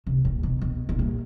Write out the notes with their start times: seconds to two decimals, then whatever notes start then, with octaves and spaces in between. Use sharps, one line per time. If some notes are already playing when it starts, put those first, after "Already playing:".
0.07 C3
0.25 A#2
0.43 B2
0.62 B2
0.89 A#2
0.99 G2